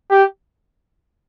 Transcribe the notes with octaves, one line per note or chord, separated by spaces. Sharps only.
G4